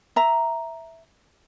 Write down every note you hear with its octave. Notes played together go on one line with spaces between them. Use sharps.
E5 A#5